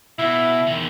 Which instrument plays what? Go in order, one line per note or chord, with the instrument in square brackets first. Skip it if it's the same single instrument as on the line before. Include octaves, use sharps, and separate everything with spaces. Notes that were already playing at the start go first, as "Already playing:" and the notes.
[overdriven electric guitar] B2 [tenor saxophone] E4
[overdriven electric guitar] E2 D#3